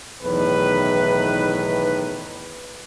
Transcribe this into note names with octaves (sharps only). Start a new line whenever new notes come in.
B1 E2 A2 D#3 B4